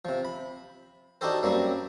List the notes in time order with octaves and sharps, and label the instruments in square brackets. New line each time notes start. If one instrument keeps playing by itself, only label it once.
[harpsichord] C3 F3
B5
D4 D#4 F#4 G4 A4 C5
F#2 F#3 G3 A#3 C4